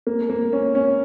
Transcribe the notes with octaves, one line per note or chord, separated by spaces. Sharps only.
A#3
A#3
C#4
C#4